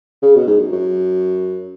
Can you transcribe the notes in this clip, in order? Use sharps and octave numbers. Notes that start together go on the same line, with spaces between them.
C#3
B2
G#2
F#2
F#2